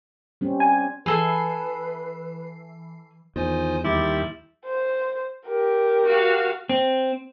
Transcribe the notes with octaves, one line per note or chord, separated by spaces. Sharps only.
G3 C4 C#4
G#5
E3 G#4 A4 B4 G#5 C7
E2 D#3 F4 C5 G#5
D#2 G3 E4 C6 D6 A6
C5
G4 A#4
F#4 F5
C4